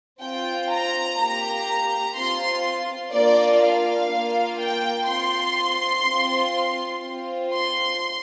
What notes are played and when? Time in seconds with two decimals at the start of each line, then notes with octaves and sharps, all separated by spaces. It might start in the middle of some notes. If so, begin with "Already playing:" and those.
0.21 C4 F4 G5
0.71 A#5
1.18 A#3 G4 A#5
2.16 C4 F4 C6
3.13 A#3 D4 F4 D5
3.62 F5
4.10 A#3 F4
4.59 G5
5.07 C4 F4 C6
6.04 C4 F4
7.02 C4 F4
7.51 C6